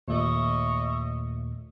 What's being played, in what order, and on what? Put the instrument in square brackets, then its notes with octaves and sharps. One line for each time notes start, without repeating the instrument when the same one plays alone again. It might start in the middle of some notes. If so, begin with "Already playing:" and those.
[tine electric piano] D#2 A#2 A3 [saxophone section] C#5 D#5 E5